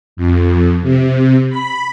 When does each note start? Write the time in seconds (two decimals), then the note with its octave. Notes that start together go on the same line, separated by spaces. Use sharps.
0.17 F2
0.83 C3
1.50 B5